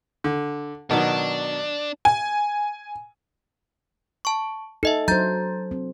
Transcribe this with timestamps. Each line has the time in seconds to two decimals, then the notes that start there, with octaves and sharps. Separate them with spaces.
0.24 D3
0.91 B2 D#3 F#3 D4
2.05 G#5
4.25 A5 C#6
4.83 D#4 A4 D#5 E5
5.08 F#3 D4 C5 A#5 G6 A6
5.71 C4